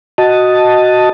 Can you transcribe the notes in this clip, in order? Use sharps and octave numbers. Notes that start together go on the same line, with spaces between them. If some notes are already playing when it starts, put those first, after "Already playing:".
F#4 D#5 A5